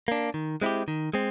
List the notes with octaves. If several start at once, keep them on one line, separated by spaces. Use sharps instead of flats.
A#3 D4
D#3
G#3 C4 E4 G4
D#3
G#3 C4